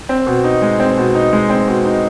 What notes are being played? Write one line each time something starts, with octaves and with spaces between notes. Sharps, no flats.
C4
B2
D#4
G#3
C4
B2
D#4
G#3
C4
B2
D#4